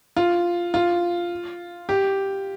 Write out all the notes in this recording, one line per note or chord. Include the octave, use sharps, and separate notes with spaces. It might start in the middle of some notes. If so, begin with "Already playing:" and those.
F4
F4
G4